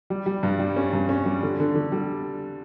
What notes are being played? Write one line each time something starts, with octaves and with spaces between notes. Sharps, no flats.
G3
G3
G2
G3
C#4
G2
C#4
G3
D3
D3
D3
G3